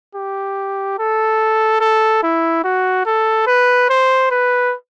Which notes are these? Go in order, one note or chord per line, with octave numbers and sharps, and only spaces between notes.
G4
A4
A4
E4
F#4
A4
B4
C5
B4